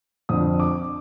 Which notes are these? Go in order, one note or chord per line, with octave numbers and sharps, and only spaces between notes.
F2 D3 D#6
D6